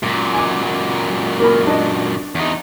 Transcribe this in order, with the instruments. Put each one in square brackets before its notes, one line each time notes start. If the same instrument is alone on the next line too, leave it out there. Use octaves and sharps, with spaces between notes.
[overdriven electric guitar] F#2 A#2
[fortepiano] G#5 D6
A#3 A#4 B5
D4 D#5
[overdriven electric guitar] E2 D#4